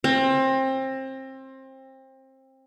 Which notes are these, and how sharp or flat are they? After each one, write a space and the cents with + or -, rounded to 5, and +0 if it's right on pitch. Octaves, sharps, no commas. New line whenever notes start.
C4 +25